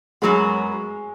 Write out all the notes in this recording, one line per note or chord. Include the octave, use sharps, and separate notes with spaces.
F#2 F#3 G#3 B3